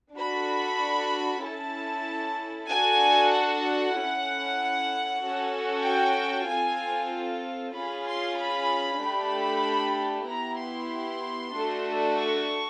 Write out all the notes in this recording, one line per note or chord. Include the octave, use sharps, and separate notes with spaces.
D4 F#4 A4 B5
C#4 E4 A4 A5
D4 F#4 A4 G#5
F#5
C#4 E4 A4
C#4 F#4 A4
G5
C4 F4 A4 G#5
C#4 F4 G#4 B5
C6
B5
A3 D4 G4 B5
B3 E4 G4 A#5
C6
A3 D4 F#4 A4
C#6